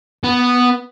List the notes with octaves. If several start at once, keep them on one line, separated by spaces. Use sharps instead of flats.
B3